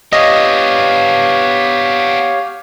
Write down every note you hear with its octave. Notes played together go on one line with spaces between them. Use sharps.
B3 D4 G4 C#5 D#5 F5